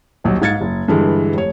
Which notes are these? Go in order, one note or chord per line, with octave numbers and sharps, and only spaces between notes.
D#1 B1 F#3
G#2 F5 G#6 A6 C#7
F#1
G2 D3 E3 G#3
F1 C#5